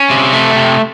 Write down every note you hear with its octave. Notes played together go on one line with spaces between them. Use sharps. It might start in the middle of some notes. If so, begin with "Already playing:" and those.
Already playing: C#4
C3
A3
C3